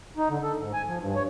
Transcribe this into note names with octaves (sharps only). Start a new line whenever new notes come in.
D#4
D3
A4
G#2
G#5
F3
G2
C#5